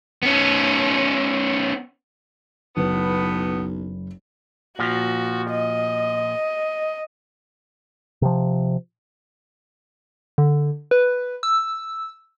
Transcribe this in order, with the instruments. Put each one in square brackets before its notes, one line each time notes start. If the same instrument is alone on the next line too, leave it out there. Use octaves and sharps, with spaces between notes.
[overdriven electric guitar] B3 C#4
[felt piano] F#1 B4 [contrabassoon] B1 [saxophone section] A2 B3
[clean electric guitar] A#2 F3 [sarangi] F#4
[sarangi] D#5
[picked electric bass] C3 F3
[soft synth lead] D3
B4
E6